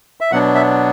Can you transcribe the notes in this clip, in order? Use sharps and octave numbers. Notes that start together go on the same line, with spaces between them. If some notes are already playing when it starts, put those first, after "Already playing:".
E5
B2 F#3 B3 D4 F#5
E5